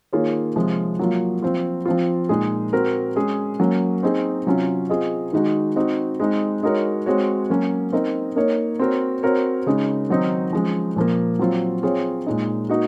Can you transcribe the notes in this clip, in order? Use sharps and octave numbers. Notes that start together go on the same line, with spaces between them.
D#3 A#3 F4 G#4 C#5
C3 F3 G#3
F#3 A#3 F4
F3 C4 F4
F3 C4 F4
A#2 G#3 D#4 G#4
C4 F#4 A#4
G#3 C#4 G#4
F#3 A#3 C#4
C4 D#4 G#4
C3 F#3 C#4 F4
C4 F4 G#4 D#5
D#3 G#3 D#4 F#4
C4 D#4 F#4
G#3 C4 D#4
G#3 D#4 F#4 A#4 C#5
G#3 C4 F#4 C#5
F#3 A#3 C#4
C4 D#4 A#4 D#5
A#3 D#4 A#4 C#5
C4 F#4 A#4 C#5
C4 F#4 A#4 C#5
C#3 G#3 D#4
D#3 F#3 C4 D#4
F3 G#3 C#4
A#2 F3 A#3
F#3 C4 F4
C4 F4 G#4 C#5
A#2 G#3 D#4
A#3 D#4 F#4